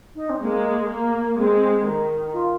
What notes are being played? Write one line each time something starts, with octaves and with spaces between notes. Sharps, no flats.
D#4
C4
G#3 A#3
A#3
G#3 C4
D#3
F4